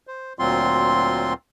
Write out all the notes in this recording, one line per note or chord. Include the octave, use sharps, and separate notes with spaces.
C5
D2 A#2 F#3 C4 F4 C6